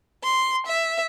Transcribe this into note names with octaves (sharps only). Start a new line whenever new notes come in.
C6
E5